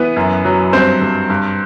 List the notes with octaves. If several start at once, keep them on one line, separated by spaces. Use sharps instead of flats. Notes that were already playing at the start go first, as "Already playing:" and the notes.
Already playing: E3 B3 B4
F#2
F#3
G2 C4 C5
G2
G2